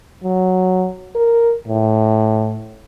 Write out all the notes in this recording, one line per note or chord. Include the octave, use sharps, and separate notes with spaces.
F#3
A#4
A2